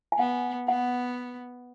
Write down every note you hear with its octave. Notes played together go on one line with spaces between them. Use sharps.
G#5
B3 F#5
B3 F#5